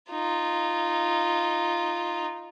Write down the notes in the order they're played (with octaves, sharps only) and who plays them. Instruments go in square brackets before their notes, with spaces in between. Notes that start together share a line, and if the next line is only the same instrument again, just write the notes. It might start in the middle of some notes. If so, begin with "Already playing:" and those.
[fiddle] D#4 F4